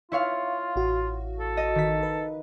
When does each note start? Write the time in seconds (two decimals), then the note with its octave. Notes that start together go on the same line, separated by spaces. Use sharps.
0.12 E4 F4 C#5 F5
0.76 A1 F#4
1.40 A4
1.57 D#5
1.75 D#3 B6
2.03 B4